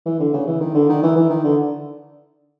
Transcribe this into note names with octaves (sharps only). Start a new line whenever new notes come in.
E3
D3
C#3
E3
D#3
D3
D#3
E3
E3
D#3
D3